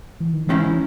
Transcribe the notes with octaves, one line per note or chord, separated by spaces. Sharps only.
E3
D#3
G#2 D#3 E3 G#3 C#4 E4
E3